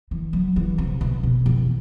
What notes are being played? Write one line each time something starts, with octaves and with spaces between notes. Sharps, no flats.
E3
F#3
E3
C3
B2
B2
E2